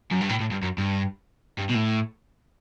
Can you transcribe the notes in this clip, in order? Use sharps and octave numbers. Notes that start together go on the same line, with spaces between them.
F#2
G2
A2
A2
G2
F#2
G2
G2
B2
A2